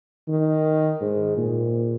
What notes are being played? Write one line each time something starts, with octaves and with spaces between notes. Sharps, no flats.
D#3
G#2
A#2